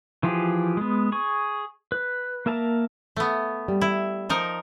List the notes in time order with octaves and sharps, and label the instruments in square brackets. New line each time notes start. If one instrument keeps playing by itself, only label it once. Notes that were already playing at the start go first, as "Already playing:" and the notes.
[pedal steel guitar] E3 F3 F4 G4 G#4
G#3 B3
G#4 C#6
B4
A#3 A#4 E5 A5 A#5
[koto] A3 B3
[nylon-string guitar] G3
[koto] E4
F3 D#4 A#4